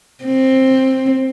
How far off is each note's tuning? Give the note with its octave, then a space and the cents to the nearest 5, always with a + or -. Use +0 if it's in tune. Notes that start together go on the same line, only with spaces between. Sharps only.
C4 +10